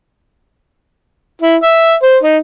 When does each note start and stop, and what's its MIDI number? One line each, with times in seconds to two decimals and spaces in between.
1.42 1.56 64
1.63 1.94 76
2.03 2.17 72
2.23 2.37 63